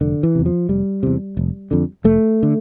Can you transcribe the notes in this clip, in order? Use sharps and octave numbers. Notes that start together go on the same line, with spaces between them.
F1 D3
E3
E2 C3
F3
F1 G3
E2 C3
F1
F2 D3
F1 A3
D3